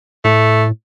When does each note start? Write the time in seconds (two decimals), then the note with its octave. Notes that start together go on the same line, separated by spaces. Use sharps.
0.25 A2 A3